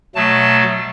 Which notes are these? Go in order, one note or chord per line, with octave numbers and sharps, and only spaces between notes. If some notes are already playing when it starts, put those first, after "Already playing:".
B2 F#3 A3 A5